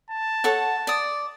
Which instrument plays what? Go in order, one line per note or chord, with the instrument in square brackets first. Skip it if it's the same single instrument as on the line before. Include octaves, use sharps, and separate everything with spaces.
[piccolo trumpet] A5
[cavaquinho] A4 C#5 F#5
D5 D#6